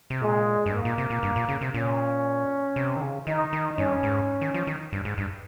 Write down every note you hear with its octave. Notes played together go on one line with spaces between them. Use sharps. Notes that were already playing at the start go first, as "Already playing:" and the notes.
C3
A#2 G#3
G2
G#2 A#3
A#2
C3
A#2
G2
A#2
C#3
C3
A#2 C#4
C3
D#3
C#3
D#3 D#4
D#3
G2 C#4
G#2
D#3
F3
D#3
G2
G#2
G2